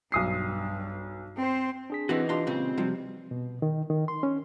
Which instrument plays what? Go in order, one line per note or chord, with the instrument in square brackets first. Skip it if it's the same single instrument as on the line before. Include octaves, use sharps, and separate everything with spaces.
[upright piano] B1 D#6 C7 [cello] G2
[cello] C4 C5
[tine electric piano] D4 G#4 B6
[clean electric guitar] E3 D#4 [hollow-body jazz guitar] C4 E4 F#4 [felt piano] B4
[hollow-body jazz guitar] D4 A#5 C6 [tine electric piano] F4 G4 D#5
[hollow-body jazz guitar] C#2 A#2 C#3 [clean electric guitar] C4
[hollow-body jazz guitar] C3 F3 [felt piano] G3 F#4
[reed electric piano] B2
D#3
D#3
C6
C#4